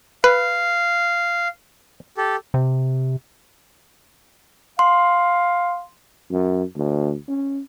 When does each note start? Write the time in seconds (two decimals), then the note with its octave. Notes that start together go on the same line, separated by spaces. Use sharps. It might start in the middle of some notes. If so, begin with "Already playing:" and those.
0.24 B4 F5
2.18 G4 A4
2.54 C3
4.79 F5 C6
6.31 F#2
6.76 D2
7.28 C#4